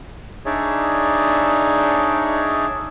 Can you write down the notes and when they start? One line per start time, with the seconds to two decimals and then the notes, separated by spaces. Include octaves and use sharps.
0.46 D4 D#4 G#4 C#5 D5 E5